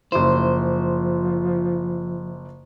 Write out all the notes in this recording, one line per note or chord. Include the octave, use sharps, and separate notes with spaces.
F#1 F3 E4 C5